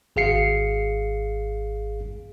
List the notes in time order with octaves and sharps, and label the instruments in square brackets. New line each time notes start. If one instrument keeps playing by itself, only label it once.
[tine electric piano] G#1 G#4 F5 C7 C#7